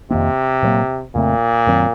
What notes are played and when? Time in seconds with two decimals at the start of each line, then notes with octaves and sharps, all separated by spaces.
0.10 F2 C3 D#3 A#3
0.63 A#2 F#3 A#3
1.15 F2 A#2 C#3 A3 C4
1.66 F#2 D#3 F#3 C4